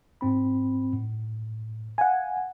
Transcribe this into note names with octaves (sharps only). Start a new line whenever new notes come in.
G#2 C4 B5
A2
F5 F#5 G#5